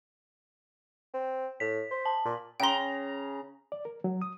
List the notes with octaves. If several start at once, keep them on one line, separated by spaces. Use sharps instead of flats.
C4
A2 B6
C5
A5
A#2
C#3 G5 A#5 C6
D5
A#4
F#3
D#6